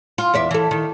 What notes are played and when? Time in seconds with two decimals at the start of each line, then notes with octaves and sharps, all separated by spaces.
0.18 F4
0.34 E2 D5 E5
0.51 E3 A4
0.71 D#3